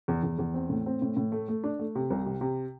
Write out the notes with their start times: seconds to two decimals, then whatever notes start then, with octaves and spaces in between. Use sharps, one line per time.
0.08 E2
0.23 E2
0.39 E2
0.54 C4
0.70 A2
0.86 C4
1.02 A2
1.17 A2
1.32 A3
1.48 A3
1.64 D4
1.79 A3
1.95 C3
2.11 C2
2.26 C3
2.41 C3